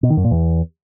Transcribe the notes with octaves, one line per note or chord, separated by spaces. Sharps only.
B2
D#3
F#2
A#2
E2